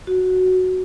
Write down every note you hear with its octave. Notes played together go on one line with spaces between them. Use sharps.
F#4